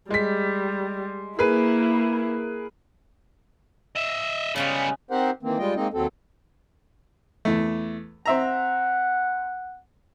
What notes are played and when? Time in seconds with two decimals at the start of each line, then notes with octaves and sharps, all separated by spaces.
0.10 G3 G#3 B6
1.39 A#3 E4 G#4 A#4 B4
3.96 D#5 E5
4.56 C#3 G3 G#3 B3 C#4
5.11 C4 D#4 G4 A#4 C5 F#5
5.43 D#3 E3 A#3 C4
5.58 G3 G#3 F4 D#5 G5
5.76 G#3 A#3 C4 D#4 D#5
5.93 D#2 F#3 C4 A4
7.45 E2 A3
8.26 C4 E5 F#5 A#5